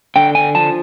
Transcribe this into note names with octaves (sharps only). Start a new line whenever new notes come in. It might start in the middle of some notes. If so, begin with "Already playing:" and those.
D3 G5
G#5
F3 A5